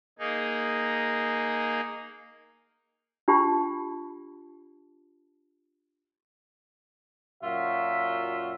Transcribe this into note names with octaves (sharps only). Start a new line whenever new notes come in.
A#3 D#4 G#4
D4 F4 G4 A5 B5
F#2 A#2 F4 F#4 E5